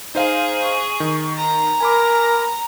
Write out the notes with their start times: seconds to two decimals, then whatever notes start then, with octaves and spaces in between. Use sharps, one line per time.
0.15 D#4 G#4 C5 F5
0.62 C#6
1.00 D#3
1.36 A#5
1.80 A#4 G#5 B5 D6